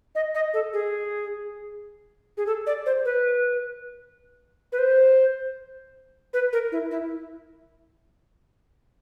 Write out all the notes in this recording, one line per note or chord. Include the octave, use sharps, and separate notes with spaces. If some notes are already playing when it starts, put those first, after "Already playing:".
D#5
D#5
A4
G#4
G#4
A4
D5
C5
B4
B4
C5
B4
A#4
E4
E4